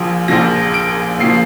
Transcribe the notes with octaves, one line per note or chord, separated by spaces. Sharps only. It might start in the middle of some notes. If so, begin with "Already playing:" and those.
Already playing: A#1 A#2 F3
A#1 A#2 F3 A#6
D7
A#1 A#2 F3 C7